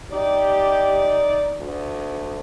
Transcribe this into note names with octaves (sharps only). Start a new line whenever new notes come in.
D#4 G4 D5
D2